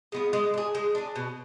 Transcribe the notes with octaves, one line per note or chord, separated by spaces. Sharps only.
G#3 B3 F4
G#3
D4
G#4
G#3
D4 G#4
B2